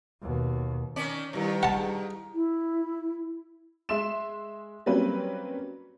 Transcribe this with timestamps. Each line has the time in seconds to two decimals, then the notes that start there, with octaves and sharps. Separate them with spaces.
0.22 D#2 B2
0.96 D#3 C#4 D5
1.33 G2 D#3 G3 E4 G4
1.63 F#5 A5
1.76 G4 G#4
2.34 E4
3.89 G#3 E5 C6 E7
4.86 F#3 G3 A#3 C4 C#4 B4